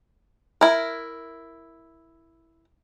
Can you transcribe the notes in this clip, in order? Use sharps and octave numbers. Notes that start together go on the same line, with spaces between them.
E4 A#4